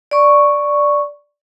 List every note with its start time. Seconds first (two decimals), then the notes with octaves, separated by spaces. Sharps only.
0.11 D5 C#6